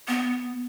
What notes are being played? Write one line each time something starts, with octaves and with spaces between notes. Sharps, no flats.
B3